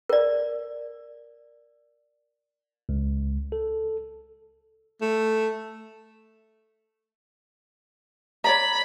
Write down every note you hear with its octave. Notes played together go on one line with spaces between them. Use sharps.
A#4 D5
C#2
A4
A3
C#5 D5 A#5 B5